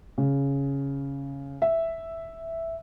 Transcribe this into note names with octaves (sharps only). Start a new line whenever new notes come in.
C#3
E5